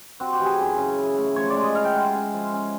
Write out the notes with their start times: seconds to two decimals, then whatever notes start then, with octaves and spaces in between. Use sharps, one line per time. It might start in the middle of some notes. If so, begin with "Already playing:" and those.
0.20 C4 F#4
0.33 G4
0.39 E3
0.45 G#4
0.59 F#2
0.78 C#3
0.98 E4
1.18 A3
1.36 F3 C#5
1.50 D5
1.56 G#3
1.63 D#5
1.75 E4 F5
1.85 G5
1.94 G#3 F#5
2.04 F5
2.15 C#4
2.34 F3
2.53 C#4